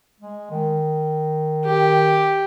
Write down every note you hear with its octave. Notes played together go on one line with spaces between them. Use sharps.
G#3
D#3
G4